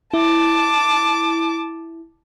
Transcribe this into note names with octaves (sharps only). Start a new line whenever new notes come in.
E4 A5 D6